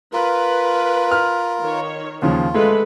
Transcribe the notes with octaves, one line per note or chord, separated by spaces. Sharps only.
F4 A#4 B4
F6
D#3 C#5
D#2 C#3 F3 F4
G#3 A3 A4 B4